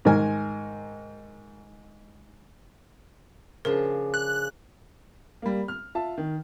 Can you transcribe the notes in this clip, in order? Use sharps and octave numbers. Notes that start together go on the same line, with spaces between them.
G#2 D#3 A#4 G#5
C#3 F3 D4 A#4
F#6
G3 A#3
F6
F4 E5 A5
D#3